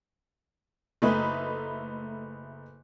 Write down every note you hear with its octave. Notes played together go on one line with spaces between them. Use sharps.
F#1 A3 D#4 B4